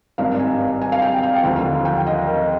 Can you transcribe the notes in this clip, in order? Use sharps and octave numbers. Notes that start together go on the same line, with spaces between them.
G#1 G2 D#3 F5
G#5
G#5
F5
G5
G5
D#2 D3 F3 F5
G5
D#5
A#4